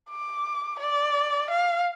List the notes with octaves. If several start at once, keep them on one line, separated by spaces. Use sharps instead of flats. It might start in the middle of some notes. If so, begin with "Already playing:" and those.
D6
D5
F5